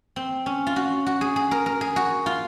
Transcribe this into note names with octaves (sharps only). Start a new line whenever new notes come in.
C4
C#4
F4
F#4
F#4
G#4
G#4
A#4
A#4
G#4
F#4
F4